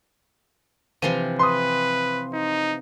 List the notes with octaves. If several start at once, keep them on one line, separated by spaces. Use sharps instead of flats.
C3 E3 F3 D#7
B4 C6 D#6
D#4